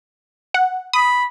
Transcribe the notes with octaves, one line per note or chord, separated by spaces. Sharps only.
F#5
B5 D#6